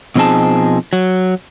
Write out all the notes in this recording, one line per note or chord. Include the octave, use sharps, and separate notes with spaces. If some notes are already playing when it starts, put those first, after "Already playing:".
B2 F3 C4 D#4 G#4 A5
F#3